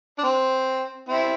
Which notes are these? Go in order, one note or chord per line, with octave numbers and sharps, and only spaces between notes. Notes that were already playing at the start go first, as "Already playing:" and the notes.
D4
C4
C4 E4